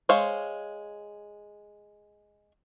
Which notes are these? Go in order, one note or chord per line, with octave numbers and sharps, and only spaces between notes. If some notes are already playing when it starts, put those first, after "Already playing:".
G#3 C5 C#5 F5